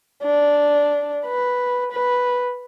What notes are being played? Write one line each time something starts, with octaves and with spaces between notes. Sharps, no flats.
D4
B4
B4